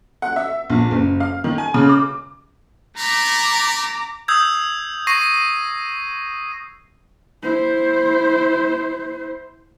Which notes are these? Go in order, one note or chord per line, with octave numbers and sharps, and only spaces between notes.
F#5
E5
A#1
F#1
F5
D#3
G#5
C#3
D6
A3 A#5 B5 D6
D#6 E6 G6 G#6
C#6 A#6 C7 D#7
E4 C5